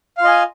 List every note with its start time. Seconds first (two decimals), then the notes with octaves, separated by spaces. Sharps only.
0.17 F5
0.21 F4
0.24 D#5
0.28 G#5